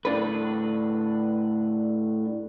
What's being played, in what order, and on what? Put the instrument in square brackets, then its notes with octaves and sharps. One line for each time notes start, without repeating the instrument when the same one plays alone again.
[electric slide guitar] A2 D4 B4